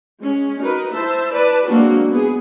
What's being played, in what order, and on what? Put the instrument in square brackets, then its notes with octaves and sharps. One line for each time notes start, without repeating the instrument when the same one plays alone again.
[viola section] G#3 C#4
D#4 F#4 A#4 B4
E4 C5 E5 A5
B4 D5 A5
F#3 G#3 A#3 C4 D4 F#4
B3 G#4